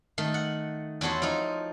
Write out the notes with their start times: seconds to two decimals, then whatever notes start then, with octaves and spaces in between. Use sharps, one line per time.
0.18 D#3 A3
0.34 F#5
1.01 E2 E4 F#4 A4 C#5 C6
1.22 F3 D#4